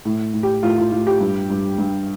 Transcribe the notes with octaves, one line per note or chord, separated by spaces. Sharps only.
A2
A2
G4
A2 F4
F4
A2 F4
G4
G2
G2
G2